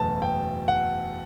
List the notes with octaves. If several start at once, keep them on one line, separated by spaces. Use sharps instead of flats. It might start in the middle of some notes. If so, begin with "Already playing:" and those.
Already playing: F#1 E2 B2 F#3 A3 A5
G5
F#5